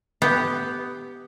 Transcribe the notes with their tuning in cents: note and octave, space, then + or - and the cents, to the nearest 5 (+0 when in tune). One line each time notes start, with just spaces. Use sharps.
B3 +10 G4 +0